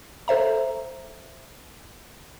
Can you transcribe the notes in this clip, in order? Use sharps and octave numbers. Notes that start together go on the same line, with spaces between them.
A4 C5 E5 A#5